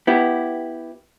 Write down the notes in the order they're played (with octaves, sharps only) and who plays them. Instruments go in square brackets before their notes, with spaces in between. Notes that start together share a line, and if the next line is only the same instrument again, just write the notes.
[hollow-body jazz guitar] B3 E4 G4